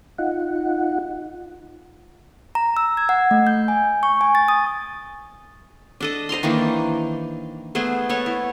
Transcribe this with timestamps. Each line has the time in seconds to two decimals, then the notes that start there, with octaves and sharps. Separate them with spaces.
0.18 D#4 F4 F#5
2.55 A#5
2.77 E6
2.97 G#6
3.09 F#5
3.31 A3
3.47 G6
3.68 G#5
4.03 C#6
4.21 G#5
4.35 A6
4.48 D#6
6.00 D4 A4 D#5
6.29 C5 D#5 A#5 C6
6.43 D#3 E3 A#3 D4
7.75 A3 B3 G#4 C5
8.09 B3 A4 C#5
8.26 E4